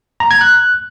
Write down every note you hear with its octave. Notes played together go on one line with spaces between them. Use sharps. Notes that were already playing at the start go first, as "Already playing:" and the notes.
A#5
G#6
F#6